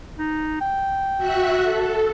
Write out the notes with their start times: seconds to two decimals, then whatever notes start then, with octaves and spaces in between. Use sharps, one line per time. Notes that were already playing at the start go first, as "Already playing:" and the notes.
0.19 D#4
0.61 G5
1.18 F#4 E5 F#6
1.62 A4